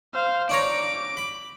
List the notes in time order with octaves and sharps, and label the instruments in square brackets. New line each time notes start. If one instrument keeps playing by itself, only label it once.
[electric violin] C5 F5
[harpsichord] D4 C#5 A#5 [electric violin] D6 D7
[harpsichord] B5